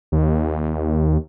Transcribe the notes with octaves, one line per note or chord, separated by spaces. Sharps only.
D#2